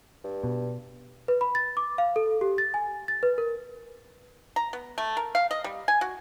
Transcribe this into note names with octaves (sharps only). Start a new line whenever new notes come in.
G2
B2
B4
B5
A6
D6
F5
A4
G4
A6
G#5
A6
B4
A#4
A#5
B3
A3
A#4
F5
D#5
G3
G#5
F#4